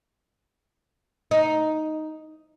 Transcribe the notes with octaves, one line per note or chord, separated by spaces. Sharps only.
D#4